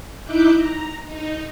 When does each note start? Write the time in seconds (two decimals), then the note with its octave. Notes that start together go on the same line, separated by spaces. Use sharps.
0.24 D#4 E4 E5 D6 F#6 G6
0.57 A#5
1.05 D#4